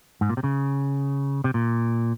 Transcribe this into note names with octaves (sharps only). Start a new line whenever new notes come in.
G#2
A#2
C3
C#3
C3
A#2